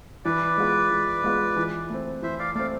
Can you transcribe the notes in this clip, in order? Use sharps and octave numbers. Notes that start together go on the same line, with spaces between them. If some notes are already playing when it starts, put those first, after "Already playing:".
E3 B4 D5
G#3 B3 F4
E3
G#3 B3 F4
E3
A3 C4
E3 C5 E5
D5 F5
A3 C4 D5 F5